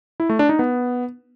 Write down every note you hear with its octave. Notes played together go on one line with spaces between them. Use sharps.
E4
A3
D4
D#4
B3